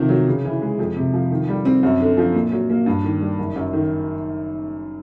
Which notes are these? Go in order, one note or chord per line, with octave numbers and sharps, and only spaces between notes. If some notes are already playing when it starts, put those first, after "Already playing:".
Already playing: C3 D#3 F3
F#3
C#3
E3
G#3
F2
C3
F3
D#3
G3
C4
F#2
D3
F3
A#2
F#3
A#3
G2
D#3
G3
F#1
F#2
D#3